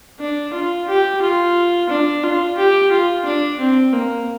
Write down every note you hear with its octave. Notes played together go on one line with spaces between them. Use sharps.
D4
F4
G4
F4
D4
F4
G4
F4
D4
C4
A#3